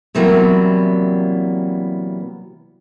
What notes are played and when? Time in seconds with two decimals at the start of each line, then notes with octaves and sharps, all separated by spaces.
0.15 C3 E3 F#3 G3 A#3 B3